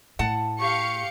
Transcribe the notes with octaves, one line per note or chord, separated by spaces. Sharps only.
A2 F#5 A5
G4 F5 C#6 C#7